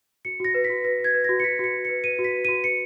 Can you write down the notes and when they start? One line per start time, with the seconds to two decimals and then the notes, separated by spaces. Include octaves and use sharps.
0.25 F#4 C#7
0.40 F#4 A#6
0.54 B4
0.64 B6
0.70 F#4
0.84 B4 A#6
0.99 B4
1.04 G#6
1.14 B4
1.24 A#6
1.29 F#4
1.40 C#7
1.44 F#4 B6
1.59 F#4 C#7
1.74 F#4
1.85 C#7
1.89 B4
2.04 B4 D#7
2.19 F#4
2.24 B6
2.34 B4
2.45 D#7
2.48 F#4
2.64 B4 C#7